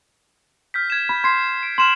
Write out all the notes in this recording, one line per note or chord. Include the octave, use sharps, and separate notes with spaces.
F6 G6 B6
G#6 E7
B5
C6 G#6 C7
D7
C6 F6 E7 F#7